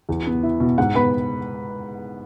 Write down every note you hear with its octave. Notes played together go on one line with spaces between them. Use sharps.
E2
B3
E4
B2
G#2 F#5
B3 B4 B5